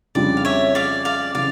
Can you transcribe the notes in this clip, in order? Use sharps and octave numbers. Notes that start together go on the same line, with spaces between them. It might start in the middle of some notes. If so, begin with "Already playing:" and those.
F2 C#3 G3 D4 F4 D5
F5
C#5 E5
D5 F5
D5 F5
C#3 E3 D5 F5